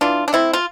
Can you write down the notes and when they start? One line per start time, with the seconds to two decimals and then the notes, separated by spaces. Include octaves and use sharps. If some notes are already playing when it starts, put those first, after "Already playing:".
0.01 E3 D4 F4
0.28 D4
0.33 A3 C4 E4
0.53 F4